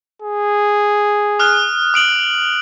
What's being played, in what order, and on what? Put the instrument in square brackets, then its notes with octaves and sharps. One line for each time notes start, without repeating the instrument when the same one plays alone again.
[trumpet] G#4
[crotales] D#6 F6 F#6
D#6 D7 F#7